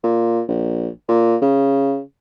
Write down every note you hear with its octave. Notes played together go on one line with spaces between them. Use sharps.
A#2
A#1
A#2
C#3